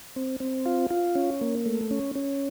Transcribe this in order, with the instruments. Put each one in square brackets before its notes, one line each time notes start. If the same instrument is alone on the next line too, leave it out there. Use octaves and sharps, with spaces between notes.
[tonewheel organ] C4
C4
F4
F4
C#4
A#3
A3
C#4
C#4